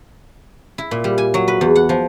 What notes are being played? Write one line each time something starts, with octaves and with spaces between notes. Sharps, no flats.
E4
A#2
G3
G#5
F#3
B4
E2
F#5
F3